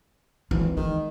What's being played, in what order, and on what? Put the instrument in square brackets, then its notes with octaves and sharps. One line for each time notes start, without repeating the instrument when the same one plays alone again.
[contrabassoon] G#1 [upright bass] E3
[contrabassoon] D#3 [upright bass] G#3